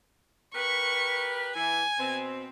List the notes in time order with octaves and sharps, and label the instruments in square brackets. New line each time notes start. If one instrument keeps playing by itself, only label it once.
[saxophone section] G4 A#4 B4 [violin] C#6
[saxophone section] E3 [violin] G#5
[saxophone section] B2 C4